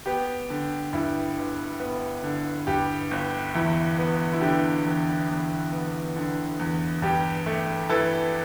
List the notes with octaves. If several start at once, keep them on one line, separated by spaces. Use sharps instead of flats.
B3 G4
D3
G2 E4
G1
B3
D3
G2 G4
G1
E2 E4
B3
E4
D3 G4
E2
E2
B3
D3
E2
G2 G4
A3
E3 E4 A4